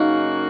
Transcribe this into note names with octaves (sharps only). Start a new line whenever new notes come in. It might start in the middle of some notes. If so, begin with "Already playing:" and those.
Already playing: F#2 C#3 A#3 D#4 F#4